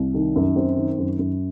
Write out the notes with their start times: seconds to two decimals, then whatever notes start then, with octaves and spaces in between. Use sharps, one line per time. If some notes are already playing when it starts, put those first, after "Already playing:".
Already playing: C2
0.14 D#3
0.36 F#2
0.56 C4
0.77 D#3
0.98 F#2
1.19 F#2